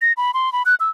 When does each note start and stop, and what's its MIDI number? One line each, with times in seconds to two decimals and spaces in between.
0.02 0.13 94
0.17 0.31 83
0.34 0.52 84
0.53 0.63 83
0.66 0.75 90
0.80 0.90 88